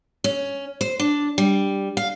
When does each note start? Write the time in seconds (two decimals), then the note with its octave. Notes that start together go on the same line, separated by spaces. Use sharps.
0.24 C#4
0.81 C5
1.00 D4
1.38 G3
1.97 F5